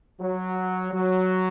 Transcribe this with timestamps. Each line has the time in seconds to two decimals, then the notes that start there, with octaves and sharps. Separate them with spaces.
0.20 F#3
0.93 F#3